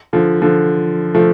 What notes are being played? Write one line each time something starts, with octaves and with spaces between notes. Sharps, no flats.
D3 F3
D3 F3
F3 A3